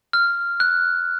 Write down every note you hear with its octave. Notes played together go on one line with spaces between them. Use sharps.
F6
F#6